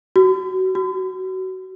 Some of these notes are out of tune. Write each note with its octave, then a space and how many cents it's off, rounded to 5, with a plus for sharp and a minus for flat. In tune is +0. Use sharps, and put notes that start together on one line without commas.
F#4 +25
F#4 +25